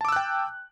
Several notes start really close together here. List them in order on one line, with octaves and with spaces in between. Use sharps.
A5 D6 E6 F#6 G5